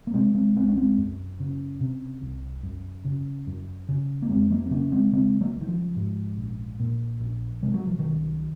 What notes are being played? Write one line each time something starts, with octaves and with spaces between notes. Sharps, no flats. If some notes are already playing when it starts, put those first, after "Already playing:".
A#3
C3 G#3 C4
G#3 C4
C2 G#3 C4
C#4
G#3 C4
F#2
C#3
C3
C2
F#2
C#3
F#2
C#3
A#3
F2 G#3 C4
F#3 A#3
C4
C#3 A#3 C#4
G#3 C4
C#3 G#3 C4
F#3 A#3
C#2
D#3
F3
G#2
A#1
A#2
A#1
C3 G#3
F#3
F3
C2 D#3 F#3